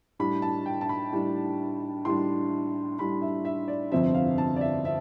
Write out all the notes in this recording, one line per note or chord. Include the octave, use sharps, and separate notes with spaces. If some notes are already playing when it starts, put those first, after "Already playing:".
A2 G3 D4 B5
A5
G5
A5
B5
A2 G3 D4
A2 G3 D4 C6
A2 G3 D4 B5
E5
E5
D5
G1 F2 C3 F3 C4 E5
F5
A5
D5
E5
C4 E5